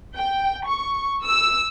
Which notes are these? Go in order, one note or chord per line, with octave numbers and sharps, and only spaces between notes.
G5
C#6
E6